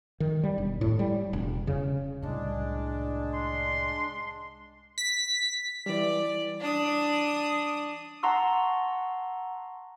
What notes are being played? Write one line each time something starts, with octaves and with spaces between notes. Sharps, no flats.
D#3
G3
E1
A2
G3
E1
C#3
C2 A2 G#3 D4
C6
B6
E3 G3 D5
D4 D#6
F#5 A5 A#5 C6 C#6 E6